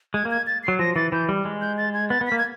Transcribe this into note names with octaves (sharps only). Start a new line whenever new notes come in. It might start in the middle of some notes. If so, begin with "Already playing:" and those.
G#3 G#6
A#3
G#6
A6
F#3 C7
F3 A#6
E3 A6
E3 G6
G3
G#3
G6
A6
G#6
B3 A6
B3
A#3 B6
G#6